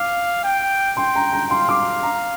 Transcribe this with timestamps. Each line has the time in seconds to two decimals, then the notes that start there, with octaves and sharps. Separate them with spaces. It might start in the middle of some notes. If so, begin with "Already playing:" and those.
Already playing: F5 D6
0.44 G5
0.97 G5 C6
1.15 A#5
1.33 A#5
1.50 F5 C6
1.69 D6
2.03 A#5